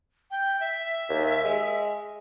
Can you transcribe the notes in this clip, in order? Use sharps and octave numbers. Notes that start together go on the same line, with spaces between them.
G5
E5
D#2
G#3